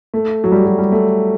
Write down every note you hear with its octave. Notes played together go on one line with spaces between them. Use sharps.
A3
F#3
G3
F#3
G3
A3